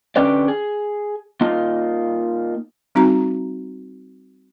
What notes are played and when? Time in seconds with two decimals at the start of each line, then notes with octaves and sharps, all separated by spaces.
0.16 D3 C#4 G4 B4 D5
0.48 G#4
1.41 A#3 D#4 F4
2.95 G3 C4 D#4 F#4 A#5